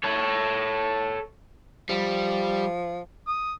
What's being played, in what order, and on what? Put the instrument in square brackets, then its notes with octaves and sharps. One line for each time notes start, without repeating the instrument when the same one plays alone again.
[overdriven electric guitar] A4 C#5
[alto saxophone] F3 [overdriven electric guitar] G3
[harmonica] D#6